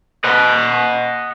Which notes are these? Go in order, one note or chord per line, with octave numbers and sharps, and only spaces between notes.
D#5 F#5